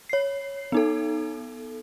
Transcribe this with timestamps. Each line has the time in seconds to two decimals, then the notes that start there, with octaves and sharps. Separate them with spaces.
0.09 C#5 C7
0.72 B3 D#4 A4